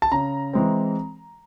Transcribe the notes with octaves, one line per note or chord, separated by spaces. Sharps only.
A5
C#3 A#5
E3 G#3 C4